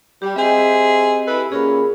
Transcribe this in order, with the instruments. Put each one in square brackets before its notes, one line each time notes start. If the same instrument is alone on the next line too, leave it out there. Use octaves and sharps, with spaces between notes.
[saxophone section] G3 [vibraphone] G4
[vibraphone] C4 G4 D#5 [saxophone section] G#4 C5 E5
[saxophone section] E4 A4 B4
[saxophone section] A#2 C#4 [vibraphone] G#4 A#4 B5